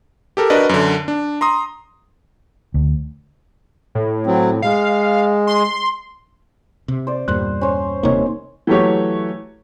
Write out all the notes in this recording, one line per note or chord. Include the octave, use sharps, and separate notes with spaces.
G4 A4 A#4
D4 F#4 A#4 B4 D5 D#5
F#2 D3
D4
A#5 C6 D#6
D2
A2
F#3 C4
G#3 F5
C6
C3
C5 D5
E2 G2 A#2 C5 F#6
C#4 C5
D#1 C3 A#3 D#4 C#5
E3 F#3 A3 G4 C#5